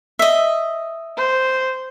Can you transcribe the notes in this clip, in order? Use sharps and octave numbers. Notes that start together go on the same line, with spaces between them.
D#5 E5
C5